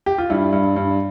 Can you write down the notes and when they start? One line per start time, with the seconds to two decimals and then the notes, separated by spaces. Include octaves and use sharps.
0.06 G4
0.18 F4
0.30 G2 E4
0.53 G2
0.76 G2